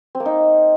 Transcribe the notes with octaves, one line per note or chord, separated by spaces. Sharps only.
C4
A#3
D#4